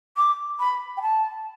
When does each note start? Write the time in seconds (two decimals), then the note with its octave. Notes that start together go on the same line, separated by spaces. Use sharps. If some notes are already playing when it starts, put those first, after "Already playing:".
0.17 D6
0.59 B5
0.97 G5
1.02 A5